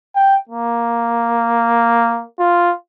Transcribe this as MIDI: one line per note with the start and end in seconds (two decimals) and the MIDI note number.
0.15 0.36 79
0.49 2.24 58
2.39 2.72 65